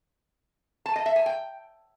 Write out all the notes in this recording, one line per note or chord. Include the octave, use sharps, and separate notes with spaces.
A5
D#5
E5
G#5
G5